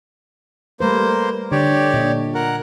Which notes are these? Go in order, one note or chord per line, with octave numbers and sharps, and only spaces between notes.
G3 A3 A#3 B4 C5
D3 G4 C#5 D5
A#2 D4 D#5
A#4 F#5